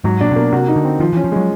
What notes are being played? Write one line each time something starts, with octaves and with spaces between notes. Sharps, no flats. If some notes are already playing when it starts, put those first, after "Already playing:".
G#2 F#3
A#2 D4
C3
B2 A#3
C3 F#4
D#4
D3
C4
D#3 F3
E3 C#4
F3
F#3 G#3